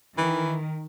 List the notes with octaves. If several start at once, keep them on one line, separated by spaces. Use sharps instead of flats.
D#3 E3